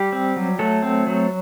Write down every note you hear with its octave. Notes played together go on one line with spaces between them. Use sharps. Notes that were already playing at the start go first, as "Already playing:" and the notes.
Already playing: G3 G4
C4
F#3
F#3 A3 A4
C4
F#3